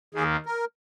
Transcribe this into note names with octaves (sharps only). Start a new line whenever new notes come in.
D#2 D#3 A#3 G#4
A#4